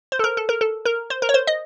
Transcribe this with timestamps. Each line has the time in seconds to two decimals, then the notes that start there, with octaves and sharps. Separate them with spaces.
0.12 C5
0.19 A4
0.24 A#4
0.37 A4
0.49 A#4
0.61 A4
0.85 A#4
1.10 C5
1.22 A#4
1.29 C#5
1.34 C5
1.47 D#5